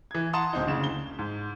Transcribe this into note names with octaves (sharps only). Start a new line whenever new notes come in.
E3 G#6
F#5 A5 A#5 C6 D#6
D1 C4 D#4
F#1 D2 C#3 E7
G7
G#2